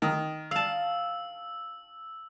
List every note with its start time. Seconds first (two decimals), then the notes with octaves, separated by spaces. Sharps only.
0.02 D#3
0.51 F5 A5 E6